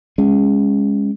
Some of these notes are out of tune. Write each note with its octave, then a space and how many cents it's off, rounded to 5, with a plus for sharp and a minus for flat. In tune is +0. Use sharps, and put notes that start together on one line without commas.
G#3 -20 C#4 +0